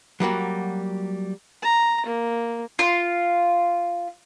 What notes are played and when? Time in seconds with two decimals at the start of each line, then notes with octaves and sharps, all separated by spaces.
0.20 F#3 G3 A#3 F#4
1.62 A#5
2.06 A#3
2.79 F4